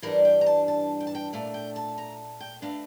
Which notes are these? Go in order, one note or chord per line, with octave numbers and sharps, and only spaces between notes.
G2 E3 G3 D4 A#4
G5
A#5
A5
A5
G5
A5
G5
A#2 A3 D4 F5
G5
A5
A#5
G5
E3 A3 D4 F5